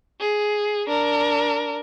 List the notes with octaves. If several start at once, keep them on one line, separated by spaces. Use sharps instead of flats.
G#4
D4 A#4